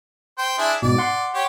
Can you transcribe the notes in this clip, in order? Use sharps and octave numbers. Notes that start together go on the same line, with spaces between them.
C5 G5
D4 E4 G#4
G#2 B2 D5
F#5 C6
G4 C#5